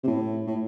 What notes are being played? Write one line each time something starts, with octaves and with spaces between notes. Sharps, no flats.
C3
A2
A2